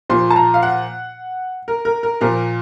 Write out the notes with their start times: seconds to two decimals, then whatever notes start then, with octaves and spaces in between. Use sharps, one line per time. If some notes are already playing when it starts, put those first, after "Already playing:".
0.09 A#2 F3 C6
0.30 A5
0.36 A#5
0.54 F5
0.63 F#5
1.68 A#4
1.85 A#4
2.03 A#4
2.21 A#2 F3 A#4